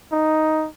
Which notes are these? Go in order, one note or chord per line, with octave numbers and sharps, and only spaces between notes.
D#4